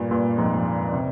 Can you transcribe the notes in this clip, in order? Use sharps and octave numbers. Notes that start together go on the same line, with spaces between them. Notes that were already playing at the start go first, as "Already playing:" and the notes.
Already playing: G2 A#2
G2 A#2
F2 G#2
C3